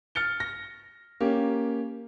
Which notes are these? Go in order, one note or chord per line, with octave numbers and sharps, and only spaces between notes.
F6 A6 C#7 G7
A#6
A#3 C#4 G4